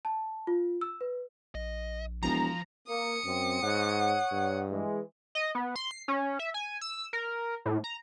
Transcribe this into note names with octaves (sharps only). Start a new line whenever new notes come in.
A5
F4
E6
B4
A#1 D#5
E1 F3 A#5
A#3 D#6 C#7
F#2 C4
G#2 C#5 F#5
G2
E3 G#3
D#5
B3
C6
C7
C#4
E5
G#5
E6
A#4
A2
A#5